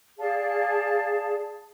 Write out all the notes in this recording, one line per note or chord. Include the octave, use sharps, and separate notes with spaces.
G#4 D5 F5 A5